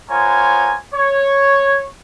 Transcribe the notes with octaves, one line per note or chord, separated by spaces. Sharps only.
B3 F4 A#4 C5 C#5 G#5
C#5